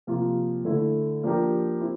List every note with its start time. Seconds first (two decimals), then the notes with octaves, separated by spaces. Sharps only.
0.07 C3 F3 A#3 F4
0.65 D3 A3 E4
1.23 F3 A#3 D4 G4 A#4
1.81 C4 E4